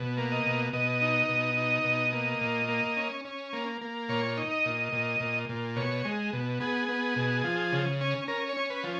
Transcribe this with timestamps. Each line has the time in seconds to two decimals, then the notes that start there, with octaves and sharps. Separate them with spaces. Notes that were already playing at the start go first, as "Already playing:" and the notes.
Already playing: B2
0.17 A#3
0.32 D#5
0.46 B2
0.73 B2 D#5
1.01 D#4
1.29 B2
1.57 D#4
1.84 B2
2.12 A#3
2.41 A#2
2.68 A#3
2.97 C#4
3.25 C#4
3.53 A#3
3.81 A#3
4.09 A#2 C#5
4.37 D#4
4.51 D#5
4.65 A#2
4.93 A#2
5.20 A#2
5.49 A#2
5.76 B2 C#5
6.05 G#3
6.33 B2
6.60 B3 G#4
6.88 B3
7.16 B2
7.44 F3
7.72 C#3
8.01 C#4
8.28 C#4 A#4
8.49 C#5
8.57 C#4
8.70 B4
8.84 F3